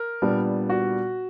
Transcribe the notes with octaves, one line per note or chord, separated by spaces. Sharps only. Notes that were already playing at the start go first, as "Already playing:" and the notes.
Already playing: A#4
A#2 G3 B3 D4
F#4